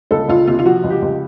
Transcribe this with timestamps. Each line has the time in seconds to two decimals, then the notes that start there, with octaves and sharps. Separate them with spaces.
0.11 C#2 A4
0.28 C#2 F4
0.47 C3 F4
0.59 F4
0.65 F3 F#4
0.84 C#2
0.90 G4
1.02 C#2